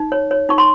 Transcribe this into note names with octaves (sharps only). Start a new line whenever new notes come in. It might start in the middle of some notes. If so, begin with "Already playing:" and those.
Already playing: D#4
C#5
C#5
D#4 C#6
C6